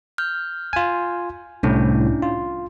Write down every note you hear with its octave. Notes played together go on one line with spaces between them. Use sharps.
F6 G6
F4 G#5
C2 A2 C#4 D4 E4
F4